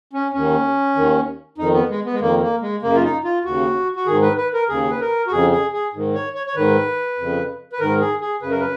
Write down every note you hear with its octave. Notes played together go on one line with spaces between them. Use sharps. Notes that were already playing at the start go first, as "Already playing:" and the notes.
C#4
D#2 D#3 C#4
D#2 D#3
F2 D#3 D#4
B3
G#3
B3
G#3
F2 D#3 A#3
A#3
G#3
F#2 C#3 A#3
F4
D#4
F4
D#2 C#3 F#4
F#4
G#2 D#3 G#4
B4
B4
A#4
D#2 C#3 G#4
B4
A#4
F#4
F2 C#3 G#4
G#4
G#4
G#2 D#3
C#5
C#5
C#5
G#2 D#3 B4
F2 C#3
B4
G#2 D#3 A#4
G#4
G#4
F#2 C#3 B4
A#4
B4